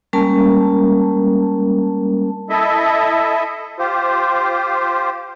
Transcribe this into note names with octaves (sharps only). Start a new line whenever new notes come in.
G3 G#3 A#3 C#4 A#4 A5
E4 A4 D#5 E5
F4 G4 C5